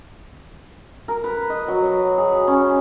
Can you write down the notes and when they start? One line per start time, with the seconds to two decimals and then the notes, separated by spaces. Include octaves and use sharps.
1.08 A#4
1.24 B4
1.50 D#5
1.68 F#3
2.18 G#4
2.47 C#4